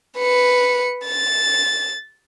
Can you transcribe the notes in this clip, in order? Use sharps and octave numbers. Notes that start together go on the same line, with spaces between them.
B4 C#7
A6